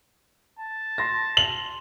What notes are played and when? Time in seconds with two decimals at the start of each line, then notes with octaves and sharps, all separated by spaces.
0.59 A5
0.98 C6 A#6
1.37 F#7